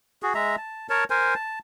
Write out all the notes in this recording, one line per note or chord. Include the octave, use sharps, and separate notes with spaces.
F#4 G#4
G#3 E5 A#5
A5
A#4 C#5 A5
A#4 C5 G#5
A5